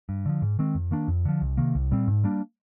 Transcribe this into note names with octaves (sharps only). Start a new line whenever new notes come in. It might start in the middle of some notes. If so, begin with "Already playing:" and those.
G2
D3 F3
G#2
D#3 G#3 C4
F2
D#3 A#3 D4
F2
D3 F3
C2
C3 D#3 A#3
C2
A#2 G3 C4
G#2
G3 A#3 D4